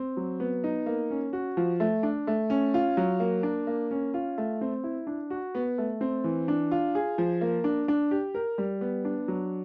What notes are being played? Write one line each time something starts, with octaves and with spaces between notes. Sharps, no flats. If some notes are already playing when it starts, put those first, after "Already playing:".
Already playing: C4
F#3
B3
D#4
A#3
C#4
F#4
F3
A3
D4
A3
C#4
F4
F#3
A#3
D4
A#3
C#4
F4
A3
C4
E4
D4
F#4
B3
A3
C4
E3
D4
F4
G#4
F3
A#3
D4
D4
G4
A#4
G3
B3
D4
F#3